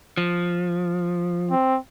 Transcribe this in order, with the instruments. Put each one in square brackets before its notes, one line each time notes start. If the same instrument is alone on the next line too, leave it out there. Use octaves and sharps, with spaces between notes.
[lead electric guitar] F3
[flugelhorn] C4